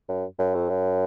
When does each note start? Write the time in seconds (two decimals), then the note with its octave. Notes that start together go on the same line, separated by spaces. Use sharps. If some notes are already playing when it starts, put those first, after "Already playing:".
0.09 F#2
0.39 F#2
0.55 F2
0.69 F#2